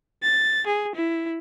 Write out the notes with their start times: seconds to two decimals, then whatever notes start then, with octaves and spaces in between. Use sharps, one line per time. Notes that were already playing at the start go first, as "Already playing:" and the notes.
0.22 A6
0.67 G#4
0.95 E4